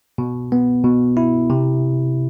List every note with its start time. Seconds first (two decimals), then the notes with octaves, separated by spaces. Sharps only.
0.18 B2
0.52 B3
0.84 B2
1.17 E4
1.50 C3